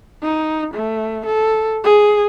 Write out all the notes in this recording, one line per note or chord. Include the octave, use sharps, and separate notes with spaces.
D#4
A3
A4
G#4